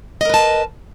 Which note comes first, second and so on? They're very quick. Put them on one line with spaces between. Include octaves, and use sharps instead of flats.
D#5 A#4 B4 A5